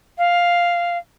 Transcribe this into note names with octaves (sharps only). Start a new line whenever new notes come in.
F5